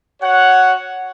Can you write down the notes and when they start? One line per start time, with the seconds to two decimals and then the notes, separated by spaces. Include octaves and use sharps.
0.21 F#4 C#5 F#5